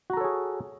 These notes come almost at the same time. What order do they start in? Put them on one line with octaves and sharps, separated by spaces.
F#4 A#5 A4 C#5 G#4